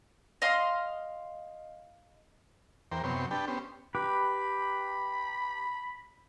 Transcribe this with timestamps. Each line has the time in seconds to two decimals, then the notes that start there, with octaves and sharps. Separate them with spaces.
0.42 D#5 F5 C6
2.92 E2 A#4 C5 G5
3.04 F#2 C3 B3 C#5 G5 C6
3.31 D4 G4 B4 G5 A5
3.48 B3 C#4 G4 C5
3.95 G4 B4 B5